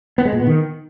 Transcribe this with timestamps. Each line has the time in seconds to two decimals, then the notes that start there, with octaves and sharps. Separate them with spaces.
0.18 B3
0.25 G#3
0.32 A#2
0.40 B3
0.47 D#3